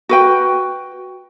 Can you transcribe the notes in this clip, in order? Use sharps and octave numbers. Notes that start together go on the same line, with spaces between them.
F#4 B4 G5